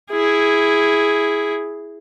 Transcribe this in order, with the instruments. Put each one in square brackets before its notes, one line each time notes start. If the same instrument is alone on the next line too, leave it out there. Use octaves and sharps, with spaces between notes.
[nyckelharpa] E4 G#4